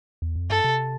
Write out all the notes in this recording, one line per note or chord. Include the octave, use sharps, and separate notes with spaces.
E2
F2
G2 A4
C3